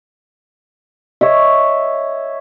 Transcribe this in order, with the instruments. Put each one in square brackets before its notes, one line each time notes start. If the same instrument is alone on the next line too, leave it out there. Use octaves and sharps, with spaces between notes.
[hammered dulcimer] C#5 D#5 E5